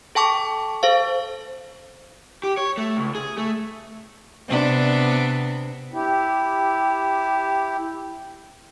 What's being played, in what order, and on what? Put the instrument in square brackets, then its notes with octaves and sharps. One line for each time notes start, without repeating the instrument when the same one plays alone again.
[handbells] A4 G5 A5 C#6 D6
A4 C5 F5
[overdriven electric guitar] G4
C#5
A3
C#2
G#4
A3
[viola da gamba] C3 B3 D4
[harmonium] E4 G4